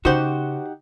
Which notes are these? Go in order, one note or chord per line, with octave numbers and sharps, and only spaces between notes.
C#3 D#4 F#4 G4 C5 F#5